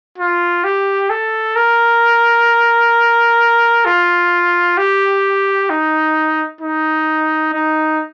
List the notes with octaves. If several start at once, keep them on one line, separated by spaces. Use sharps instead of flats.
F4
G4
A4
A#4
F4
G4
D#4
D#4
D#4